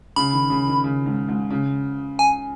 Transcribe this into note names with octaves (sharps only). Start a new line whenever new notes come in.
C#3 B5
D#3
C#3
D#3
C#3
G#2
G#2
C#3
G#5